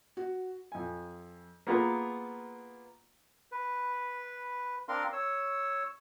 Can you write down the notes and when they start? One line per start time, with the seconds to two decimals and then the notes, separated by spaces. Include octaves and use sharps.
0.17 F#4
0.72 F2 G#5
1.67 A#3 B3 F4 G#4 A#4 B4
3.52 B4
4.88 C4 D4 A#4 F5 C6
5.13 C#5 E6